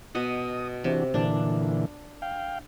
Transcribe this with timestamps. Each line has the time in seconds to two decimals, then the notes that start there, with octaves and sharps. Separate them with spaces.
0.15 B2 D#5 F#5 D#6
0.84 C3 E3 D4 F#4
1.14 A#2 D3 E3 D4
2.22 F5 G5